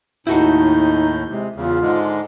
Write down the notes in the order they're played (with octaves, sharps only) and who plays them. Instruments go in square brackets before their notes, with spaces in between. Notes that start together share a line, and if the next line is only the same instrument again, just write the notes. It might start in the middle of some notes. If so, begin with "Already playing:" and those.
[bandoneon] D#2 A2 G6 [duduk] D#4 [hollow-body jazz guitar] E4 F#4 A4
[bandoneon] C3 [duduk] G#3
[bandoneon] E2 C#3 [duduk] F4
[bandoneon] G#2 D3 G#3